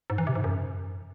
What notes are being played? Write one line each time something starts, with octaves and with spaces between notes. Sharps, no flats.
G#2
E3
C3
G#2
F#2